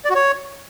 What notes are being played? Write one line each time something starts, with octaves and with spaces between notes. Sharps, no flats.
D5
F#4
C#5